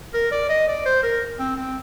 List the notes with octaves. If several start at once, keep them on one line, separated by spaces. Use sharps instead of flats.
A#4
D5
D#5
D5
C5
A#4
C4
C4